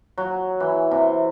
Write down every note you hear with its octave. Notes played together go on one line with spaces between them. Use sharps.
F#3
E3
C3